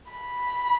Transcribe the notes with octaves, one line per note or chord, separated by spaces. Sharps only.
B5